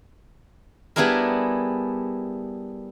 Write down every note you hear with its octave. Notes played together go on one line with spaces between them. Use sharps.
G3 B3 D4 E4 G#4 A#4